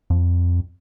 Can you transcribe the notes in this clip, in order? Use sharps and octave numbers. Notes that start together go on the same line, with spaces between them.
F2